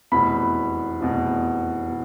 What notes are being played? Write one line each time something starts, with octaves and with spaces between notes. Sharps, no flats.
F1 E2 B2 B5
F1 E2 B2
B2